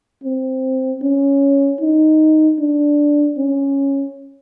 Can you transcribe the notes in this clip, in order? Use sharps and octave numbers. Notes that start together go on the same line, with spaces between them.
C4
C#4
D#4
D4
C#4